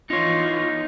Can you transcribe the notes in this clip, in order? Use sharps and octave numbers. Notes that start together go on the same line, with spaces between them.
E3 D#4 F4 C#5